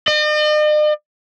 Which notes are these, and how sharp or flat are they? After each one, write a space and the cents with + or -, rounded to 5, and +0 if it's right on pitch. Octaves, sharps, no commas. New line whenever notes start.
D#5 -45